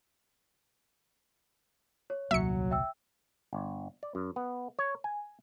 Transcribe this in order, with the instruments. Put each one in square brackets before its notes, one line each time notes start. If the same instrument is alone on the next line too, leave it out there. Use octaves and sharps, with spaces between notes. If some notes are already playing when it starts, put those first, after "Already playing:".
[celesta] C#5
[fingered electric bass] D#1 C2 A#3 [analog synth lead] F#3 [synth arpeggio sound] E5 C#7
[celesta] E5 G5 E6
[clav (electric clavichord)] G1
D5
F#2
B3
C#5
G#5